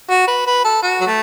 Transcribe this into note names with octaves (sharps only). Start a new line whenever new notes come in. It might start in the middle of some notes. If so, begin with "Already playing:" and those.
F#4
B4
B4
A4
F#4
F#3
A3